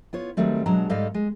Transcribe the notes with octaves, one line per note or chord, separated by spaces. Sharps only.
B3 F4 C#5
D#3 F#3 G3 A3 C4
B2 F#3 G#3 D4 F#5 A#5
G#2 G3 A4 D#5 F5
G#3